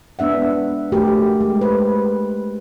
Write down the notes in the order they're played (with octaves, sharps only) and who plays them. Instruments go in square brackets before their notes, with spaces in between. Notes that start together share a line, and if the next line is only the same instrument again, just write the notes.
[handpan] G#3 B3 D4 E5 F#5
A3 F#4 G4 A#4
G#3
B4 C5